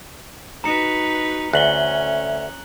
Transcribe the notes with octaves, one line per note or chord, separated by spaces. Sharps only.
D#4 F#4 B4 A#5 C#7
D2 C#4 E5 F#6 F#7 G7